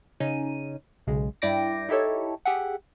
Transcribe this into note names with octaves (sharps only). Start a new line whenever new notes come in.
C#3 C#4 D#4 D#7
B1 C#3 G#3
G2 E4 D5 G5 D6 A#6
D#4 E4 G4 A4 C#5
G4 G#4 E5 F#5